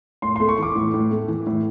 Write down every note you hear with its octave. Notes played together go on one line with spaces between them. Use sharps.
A2 C6
A3 C6
C#6
E3 D6
A2
A2
A3
E3
A2